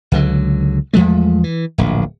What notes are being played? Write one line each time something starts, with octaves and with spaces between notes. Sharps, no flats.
C#2 D3 F#3
E2 F3 G#3 A3
E3
D1 A#1